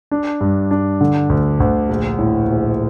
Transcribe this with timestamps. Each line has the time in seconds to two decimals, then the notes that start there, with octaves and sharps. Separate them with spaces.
0.11 D4
0.41 G2
0.71 D4
1.01 D3
1.29 D2
1.60 D2
1.89 A#1
2.19 A2
2.48 A#1